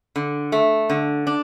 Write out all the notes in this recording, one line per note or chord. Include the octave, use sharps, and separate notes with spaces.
D3
A3
D3
D4